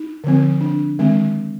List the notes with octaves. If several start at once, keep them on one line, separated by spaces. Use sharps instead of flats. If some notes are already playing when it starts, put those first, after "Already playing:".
Already playing: D#4
D3 F3 C4
D4
D#3 G#3 C4